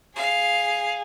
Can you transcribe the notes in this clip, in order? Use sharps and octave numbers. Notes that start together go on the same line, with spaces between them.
G#4 F5